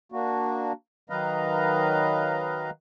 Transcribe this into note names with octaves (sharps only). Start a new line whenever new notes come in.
A#3 D4 F#4
D#3 F#3 B4 D#5 F5 A#5